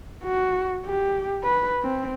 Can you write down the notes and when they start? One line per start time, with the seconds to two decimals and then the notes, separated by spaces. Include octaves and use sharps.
0.24 F#4
0.86 G4
1.44 B4
1.83 C4